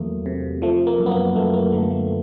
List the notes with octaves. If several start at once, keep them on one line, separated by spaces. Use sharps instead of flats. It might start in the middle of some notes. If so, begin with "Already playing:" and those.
Already playing: E2 D#3 F#3 A3 A#3
C3
F3 A3
A#3
F#2
B3
A#3
F#2 A3
A#3
D3 A3
A3